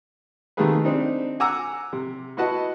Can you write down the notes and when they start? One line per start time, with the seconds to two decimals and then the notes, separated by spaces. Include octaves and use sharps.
0.57 C3 D#3 A3 A#3 G#4 B4
0.84 C4 D4 D#4
1.40 F#5 G#5 A#5 D6 E6
1.93 C3
2.37 E4 F#4 B4 D#5 F#5 A5